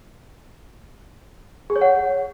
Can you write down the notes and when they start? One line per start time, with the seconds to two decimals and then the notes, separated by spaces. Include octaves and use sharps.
1.70 G#4
1.76 C#5
1.81 F#5